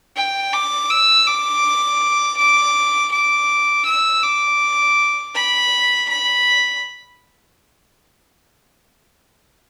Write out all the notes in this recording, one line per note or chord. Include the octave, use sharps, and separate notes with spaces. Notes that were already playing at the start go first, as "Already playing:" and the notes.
G5
D6
E6
D6
D6
D6
E6
D6
B5
B5